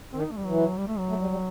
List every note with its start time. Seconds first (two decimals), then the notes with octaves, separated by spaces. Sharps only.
0.13 D#3 C4
0.22 D#4
0.32 A3
0.37 G3
0.45 E3 F#3
0.78 G3
0.87 A3
0.99 F#3
1.09 A3
1.21 G3
1.31 G3